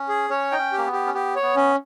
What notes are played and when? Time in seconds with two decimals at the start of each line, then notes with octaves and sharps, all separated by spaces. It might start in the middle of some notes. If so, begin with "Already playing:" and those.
Already playing: C#4
0.09 G#4
0.30 C#4 C#5
0.51 D#4 G5
0.58 C#4
0.72 G4
0.78 A#3
0.86 B3
0.93 G4
1.07 C#4
1.14 B3 G4
1.36 C#5
1.42 B3
1.56 C#4